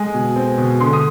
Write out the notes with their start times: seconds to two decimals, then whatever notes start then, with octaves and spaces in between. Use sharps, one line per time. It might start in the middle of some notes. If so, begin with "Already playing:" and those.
Already playing: G#3 G#5
0.14 B2
0.36 C4
0.58 B2
0.80 D3 C6
0.93 D#6